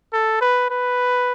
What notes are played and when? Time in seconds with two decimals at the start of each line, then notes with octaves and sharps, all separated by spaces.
0.13 A4
0.41 B4
0.70 B4